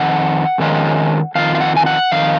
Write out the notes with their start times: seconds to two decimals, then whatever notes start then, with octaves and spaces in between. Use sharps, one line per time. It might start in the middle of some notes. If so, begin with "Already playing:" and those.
Already playing: F2 D#3 F#5
0.58 F2 D#3 G#3 C#4 F4
1.35 F2 D#3 F4 F5
1.55 F5
1.61 F#5
1.77 G#5
1.86 F#5
2.12 F2 D#3 F5